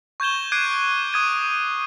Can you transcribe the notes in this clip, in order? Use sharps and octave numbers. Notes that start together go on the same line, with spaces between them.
C#6 G6 G#6 E7 G7
D6 F#6 G#6 C7 D7 D#7
C#6 D#6 G#6 D#7